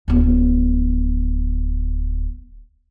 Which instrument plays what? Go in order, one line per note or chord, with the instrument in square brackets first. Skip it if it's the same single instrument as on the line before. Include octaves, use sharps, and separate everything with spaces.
[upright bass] D1 B3